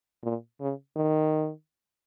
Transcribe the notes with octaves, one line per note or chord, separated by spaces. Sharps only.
A#2
C#3
D#3